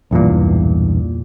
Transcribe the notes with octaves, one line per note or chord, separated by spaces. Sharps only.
B1 E2 G2 A#2